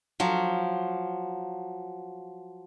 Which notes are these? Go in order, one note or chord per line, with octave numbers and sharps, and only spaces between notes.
F3 F#3